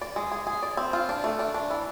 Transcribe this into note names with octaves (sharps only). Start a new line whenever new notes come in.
D5
G#3
G#4
G#4
D5
C4
F4
D4
A3
D4
D4
E3